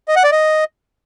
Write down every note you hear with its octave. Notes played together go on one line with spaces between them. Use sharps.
D#5
F#5
D5
D#5